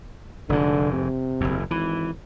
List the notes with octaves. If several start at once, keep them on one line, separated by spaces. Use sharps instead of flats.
F1 G#2 D3
C3
F#1 E2
G#1 E3